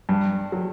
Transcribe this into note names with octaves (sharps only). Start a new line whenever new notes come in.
G2
F#3